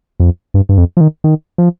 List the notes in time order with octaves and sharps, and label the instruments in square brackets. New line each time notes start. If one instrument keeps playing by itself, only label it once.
[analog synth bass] F2
G2
G2
F2
F3
D#3
D#3
F3